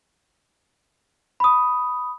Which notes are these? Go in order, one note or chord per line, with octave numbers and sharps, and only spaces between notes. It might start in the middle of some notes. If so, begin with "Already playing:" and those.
B5 D#6